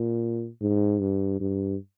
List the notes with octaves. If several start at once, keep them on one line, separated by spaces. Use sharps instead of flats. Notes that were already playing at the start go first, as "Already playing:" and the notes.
Already playing: A#2
G#2
G2
G2